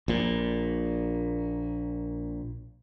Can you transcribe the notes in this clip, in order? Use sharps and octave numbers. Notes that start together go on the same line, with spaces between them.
A#1 A#2